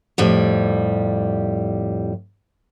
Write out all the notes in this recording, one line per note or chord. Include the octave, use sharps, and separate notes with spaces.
F2 A2 G3